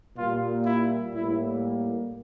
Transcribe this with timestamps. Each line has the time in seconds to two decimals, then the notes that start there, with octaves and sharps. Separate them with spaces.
0.17 A#2 G3 A#3 F4
0.65 E4
1.14 A2 G3 A#3 E4